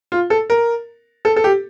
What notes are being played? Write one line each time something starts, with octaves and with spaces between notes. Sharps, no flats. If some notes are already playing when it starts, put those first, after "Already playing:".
F4
A4
A#4
A4
A4
G4